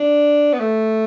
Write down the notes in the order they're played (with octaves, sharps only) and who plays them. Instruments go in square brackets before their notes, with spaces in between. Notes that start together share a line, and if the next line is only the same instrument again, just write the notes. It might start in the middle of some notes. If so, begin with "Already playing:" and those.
Already playing: [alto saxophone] D4
B3
A3